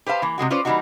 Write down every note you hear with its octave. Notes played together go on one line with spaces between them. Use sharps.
G4 B4 C5 F5 A5
E3 A#3
C3 E3 G#3 F#4
C#4 F4 B4 C5 D5
E3 G3 A3 A#3 D#4 F#4